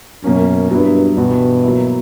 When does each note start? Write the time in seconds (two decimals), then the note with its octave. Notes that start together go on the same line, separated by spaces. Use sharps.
0.24 F#2 B2 A#3 C#4
0.71 G2 F#3 B3 E4
1.17 G2 B2 E3 B3 F#4
1.63 F#3 A#3 E4